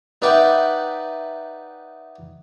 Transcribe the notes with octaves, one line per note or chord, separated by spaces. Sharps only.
D#4 B4 D5 E5 F#5 G5